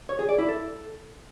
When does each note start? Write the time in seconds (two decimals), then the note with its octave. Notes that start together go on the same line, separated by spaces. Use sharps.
0.09 C#5
0.19 G#4
0.29 D5
0.39 E4
0.48 A4